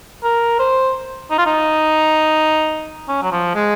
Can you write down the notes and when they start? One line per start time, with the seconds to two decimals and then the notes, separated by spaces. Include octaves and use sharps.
0.23 A#4
0.59 C5
1.31 D#4
1.38 F4
1.46 D#4
3.08 C#4
3.22 F#3
3.32 F3
3.55 G#3